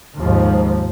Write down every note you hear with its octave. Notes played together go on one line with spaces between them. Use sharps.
D#2 G#2 F3